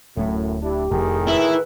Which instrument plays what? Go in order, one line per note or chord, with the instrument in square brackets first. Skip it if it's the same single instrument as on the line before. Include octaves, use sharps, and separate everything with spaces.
[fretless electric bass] D1 A3 [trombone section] F#2 A2
[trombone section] D4 E4 [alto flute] G4
[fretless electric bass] F1 [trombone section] A2 D#3 G#4
[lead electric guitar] E4 [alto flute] B4